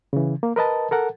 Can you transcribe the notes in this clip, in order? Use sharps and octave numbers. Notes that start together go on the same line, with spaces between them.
C#3 E3
A#3
A#4 B4 D#5 A5
A4 A#4 F#5